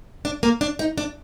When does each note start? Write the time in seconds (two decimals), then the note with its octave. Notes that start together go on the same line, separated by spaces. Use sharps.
0.25 D4
0.43 A#3
0.61 D4
0.79 D#4
0.98 D4